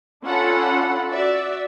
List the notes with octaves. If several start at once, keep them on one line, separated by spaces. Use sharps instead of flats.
C#4 D4 F4 A4 F#5 B5
F#4 D5 E5